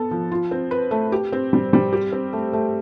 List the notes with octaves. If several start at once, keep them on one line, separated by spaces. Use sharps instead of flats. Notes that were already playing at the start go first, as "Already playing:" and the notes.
Already playing: B3 A4
F3
F4
C4
B4
A3
G4
C4
G3
G3
G4
C4
A3
A3